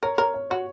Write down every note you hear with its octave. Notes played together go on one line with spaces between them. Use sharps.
A#4 C#5
A#4 C#5
C#5
F#4 C#5